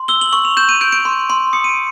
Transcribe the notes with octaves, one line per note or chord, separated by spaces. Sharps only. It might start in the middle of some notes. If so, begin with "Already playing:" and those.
Already playing: C6
E6 G7
F#7
C#6 F#7
F7
G6 E7
D#7
G6 D7
D7
C6
C6
D#6 C#7
D#7
D7